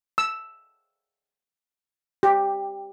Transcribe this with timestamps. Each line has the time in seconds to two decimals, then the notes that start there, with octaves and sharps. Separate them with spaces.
0.18 E6
2.23 G4